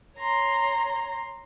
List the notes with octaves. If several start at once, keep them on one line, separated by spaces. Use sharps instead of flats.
C#5 A#5 C6